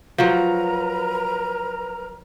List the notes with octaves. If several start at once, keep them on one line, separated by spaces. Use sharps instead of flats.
F3 F#3 A#4 B4 A#5